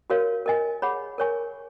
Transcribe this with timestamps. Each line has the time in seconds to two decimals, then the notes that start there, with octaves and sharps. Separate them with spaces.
0.10 F#4 A#4 C#5 F5
0.46 A#4 D#5 G#5
0.82 G#4 C#5 F#5 B5
1.18 A#4 C#5 G#5 C#6